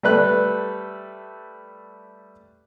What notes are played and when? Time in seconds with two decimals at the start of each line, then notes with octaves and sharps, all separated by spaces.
0.03 G3 A3 B4 F#6